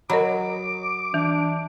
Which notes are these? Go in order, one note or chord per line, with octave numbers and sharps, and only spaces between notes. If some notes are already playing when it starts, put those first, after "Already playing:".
F#3 A#4 D#5 B5 D6
E3 D4